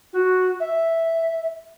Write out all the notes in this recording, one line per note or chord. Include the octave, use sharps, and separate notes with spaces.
F#4
E5